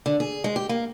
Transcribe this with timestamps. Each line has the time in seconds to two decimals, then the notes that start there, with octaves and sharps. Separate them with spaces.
0.06 D3
0.20 G#4
0.44 G#3
0.56 G4
0.69 A#3